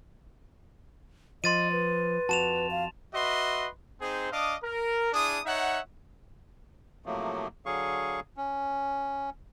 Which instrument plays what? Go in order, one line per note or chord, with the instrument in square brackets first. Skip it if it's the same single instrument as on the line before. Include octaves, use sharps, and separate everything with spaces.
[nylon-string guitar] F3 [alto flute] D#5 [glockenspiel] C6 A6 D#7
[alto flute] B4
[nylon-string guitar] F2 F#4 [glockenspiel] A5 E7 F7
[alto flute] F5
[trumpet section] F#4 B4 D#5 E5 C6
C4 D#4 G#4 C5
D4 D#5 F5 D6 D#6
A#4
D4 E4 G#4 D#6
D#4 C#5 E5 F#5
[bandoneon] A2 C3 F3 F#3 A3 A#3
D3 F#3 G#4 F5 C#6
C#4